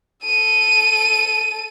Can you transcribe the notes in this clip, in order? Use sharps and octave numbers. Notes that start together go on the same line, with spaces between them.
A4 D#7